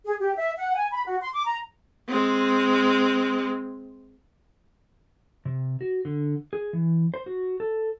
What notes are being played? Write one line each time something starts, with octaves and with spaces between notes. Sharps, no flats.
G#4
G4
E5
F#5
G#5
B5
F#4
C6
D6
A#5
G#3 C4
C3
F#4
D3
G#4
E3
C5
F#4
A4